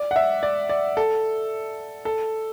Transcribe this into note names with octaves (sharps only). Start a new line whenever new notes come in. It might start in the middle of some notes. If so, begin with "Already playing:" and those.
Already playing: D5
F#5
E5
D5
D5
A4
A4